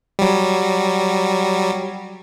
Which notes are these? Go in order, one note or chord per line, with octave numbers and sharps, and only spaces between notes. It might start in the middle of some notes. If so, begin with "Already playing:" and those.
F#3 G3